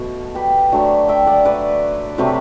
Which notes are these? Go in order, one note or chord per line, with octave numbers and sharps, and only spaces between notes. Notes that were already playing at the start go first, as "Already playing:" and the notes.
Already playing: B2 A3 F#4 A4
G4 B4
D3 F#3 A3
E5 G5
D5 F#5
B4 D5
C3 F#3 A3 G4 B4